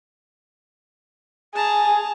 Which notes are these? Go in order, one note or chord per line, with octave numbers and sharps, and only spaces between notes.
G#4 A5 A#5